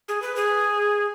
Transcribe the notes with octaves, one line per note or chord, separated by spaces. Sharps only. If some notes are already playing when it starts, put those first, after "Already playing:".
G#4
B4
G#4